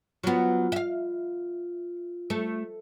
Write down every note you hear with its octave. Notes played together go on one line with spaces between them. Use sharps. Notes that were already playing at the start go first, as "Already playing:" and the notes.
F#3 B3 F4
E5 F5
A3